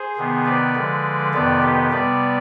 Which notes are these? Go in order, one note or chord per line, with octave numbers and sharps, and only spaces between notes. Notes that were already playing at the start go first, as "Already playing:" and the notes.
Already playing: G#4 C5
C3 D#3 B3
B4 D5
D3 F3 G#3
F2 C3 D#3 B3 B4 D5
G4 B4
C3 G3 B3 B4 D5